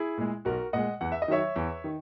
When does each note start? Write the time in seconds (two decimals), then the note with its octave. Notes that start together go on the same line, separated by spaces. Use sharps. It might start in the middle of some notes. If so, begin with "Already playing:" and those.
Already playing: E4 G#4
0.18 A#2 G#3
0.45 B1 F#4 A#4
0.73 A#2 G#3 D#5 F#5
1.01 E2 F#5
1.12 E5
1.22 D#5
1.28 D#3 F#3 C#5 E5
1.56 E2
1.84 D#3